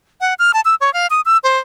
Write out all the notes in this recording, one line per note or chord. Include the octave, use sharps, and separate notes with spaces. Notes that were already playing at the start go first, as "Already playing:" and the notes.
F#5
F6
A5
E6
C#5
F5
D#6
E6
C5